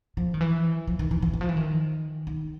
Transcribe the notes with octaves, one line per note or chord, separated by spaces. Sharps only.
F3
D#3
E3
F3
D#3
E3
E3
E3
F3
E3
D#3
D#3